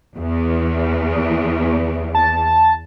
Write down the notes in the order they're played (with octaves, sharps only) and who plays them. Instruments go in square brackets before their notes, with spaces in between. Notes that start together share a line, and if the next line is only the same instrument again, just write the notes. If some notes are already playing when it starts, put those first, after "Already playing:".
[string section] E2
[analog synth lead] A5